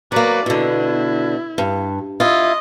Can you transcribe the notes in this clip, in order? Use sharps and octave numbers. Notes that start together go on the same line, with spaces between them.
F#3 A#3 B4 D5
B2 D3 E4
G2
E4 F4 D#5